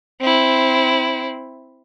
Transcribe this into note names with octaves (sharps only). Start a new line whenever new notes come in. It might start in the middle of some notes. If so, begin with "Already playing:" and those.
C4 E4